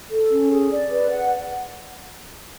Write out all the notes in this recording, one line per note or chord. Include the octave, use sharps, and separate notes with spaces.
A4
C#4
G#4
D5
B4
F#5